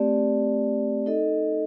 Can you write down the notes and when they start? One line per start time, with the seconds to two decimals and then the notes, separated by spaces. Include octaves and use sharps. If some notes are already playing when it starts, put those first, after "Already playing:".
Already playing: A3 C4 G4 D5
1.06 D#4 A4 D#5